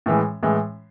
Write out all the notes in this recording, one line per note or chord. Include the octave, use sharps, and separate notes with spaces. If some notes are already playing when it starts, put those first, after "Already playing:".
A2 E3 G#3
A2 E3 G#3